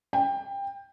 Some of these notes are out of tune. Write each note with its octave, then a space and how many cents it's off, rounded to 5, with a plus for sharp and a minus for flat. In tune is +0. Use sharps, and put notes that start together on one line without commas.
G5 +20